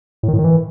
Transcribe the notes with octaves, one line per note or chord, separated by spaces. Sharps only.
A2
D#3
A2
D#3
E3